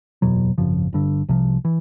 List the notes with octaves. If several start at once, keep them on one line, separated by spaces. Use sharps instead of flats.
F#1 E2 B2 F#3
G#1 F#2 C#3 F3
G1 G2 D3
C2 C3 F3
E3